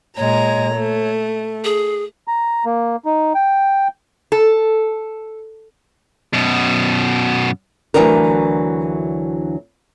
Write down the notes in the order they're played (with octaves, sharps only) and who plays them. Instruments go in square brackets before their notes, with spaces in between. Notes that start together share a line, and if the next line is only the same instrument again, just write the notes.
[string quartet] A#2 G#3 A#5 [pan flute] C#5
[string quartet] A3
[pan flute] G#4
[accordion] A#5
A#3
D#4
G5
[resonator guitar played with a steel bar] A4
[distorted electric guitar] F#2 B2
[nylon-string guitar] D2 A#2 E3 F#3 D4 A#4